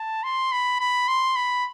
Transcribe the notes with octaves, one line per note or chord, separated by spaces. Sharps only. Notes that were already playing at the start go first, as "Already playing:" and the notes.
Already playing: A5
C6
B5
B5
C6
B5